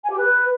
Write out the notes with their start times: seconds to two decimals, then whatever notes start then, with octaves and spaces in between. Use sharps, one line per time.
0.02 G#5
0.10 G4
0.18 B4